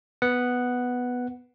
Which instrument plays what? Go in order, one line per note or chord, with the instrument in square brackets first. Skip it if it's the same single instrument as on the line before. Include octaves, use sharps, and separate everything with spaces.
[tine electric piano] B3 F#5